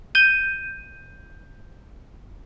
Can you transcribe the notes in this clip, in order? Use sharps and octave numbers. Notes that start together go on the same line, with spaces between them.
G6 D#7